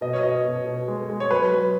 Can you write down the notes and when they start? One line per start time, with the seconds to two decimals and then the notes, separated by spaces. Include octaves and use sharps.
0.01 B2 D#5
0.13 C#5
0.23 B2 D#5
0.45 B2
0.67 B2
0.88 G#3
1.09 G#3
1.20 C#5
1.30 F#3 B4
1.52 F#3